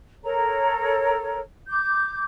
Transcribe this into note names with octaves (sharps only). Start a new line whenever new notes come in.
A4 A#4 C#5 A#5
D6 G6